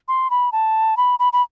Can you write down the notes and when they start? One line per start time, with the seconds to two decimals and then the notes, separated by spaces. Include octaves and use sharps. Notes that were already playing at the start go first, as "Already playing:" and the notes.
0.08 C6
0.30 B5
0.52 A5
0.97 B5
1.19 B5
1.33 B5